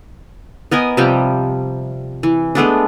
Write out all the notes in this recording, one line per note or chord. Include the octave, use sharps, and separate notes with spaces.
B3 A#4 D#5 G#5
C3 F3 G3 G5
E3
G#3 A3 B3 D4